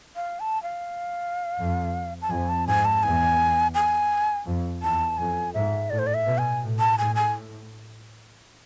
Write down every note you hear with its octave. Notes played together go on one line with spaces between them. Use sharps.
F5
A5
F5
F2
A5
F2 G#5
A5
G#2 G#5
A5
E2 G#5
G#5
F2
E2 A5
F2 G#5
G#2 E5
A2 D5
C5
D5
E5
B2
G#5
A2
A5
A2 G#5
G#5